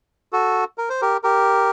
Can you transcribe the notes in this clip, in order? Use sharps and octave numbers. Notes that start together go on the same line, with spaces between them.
F#4 A4
A#4
C5
G4 A#4
G4 A#4